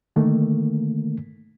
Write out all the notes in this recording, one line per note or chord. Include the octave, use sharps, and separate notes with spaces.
D3 D#3 A3 A#3